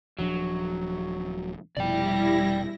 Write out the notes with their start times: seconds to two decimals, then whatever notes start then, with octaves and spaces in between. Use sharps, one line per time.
0.19 D#1 F3 F#3 D4
1.77 F1 B2 F3 G3 E4 D5 G5 A#6